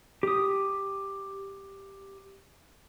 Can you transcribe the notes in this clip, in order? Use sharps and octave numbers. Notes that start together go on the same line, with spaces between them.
G4 D#6